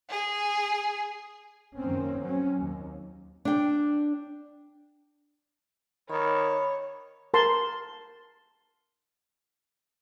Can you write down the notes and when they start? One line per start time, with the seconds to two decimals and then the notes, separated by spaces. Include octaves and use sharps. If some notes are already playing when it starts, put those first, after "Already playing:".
0.10 G#4
1.78 F#2 D#3 A#3 C4 C#4
2.21 F#3 C4 C#4
2.58 D#2
3.45 D4 G5
6.10 D#3 C#5 B5
7.34 A#4 A5 C6